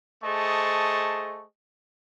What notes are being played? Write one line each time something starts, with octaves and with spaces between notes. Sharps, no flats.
A3 G#4 C5 D#5 A5 C#6